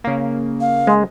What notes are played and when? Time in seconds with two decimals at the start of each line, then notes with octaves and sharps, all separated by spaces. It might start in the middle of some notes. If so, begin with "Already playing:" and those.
0.04 C#3 A#3
0.61 F5
0.87 G#3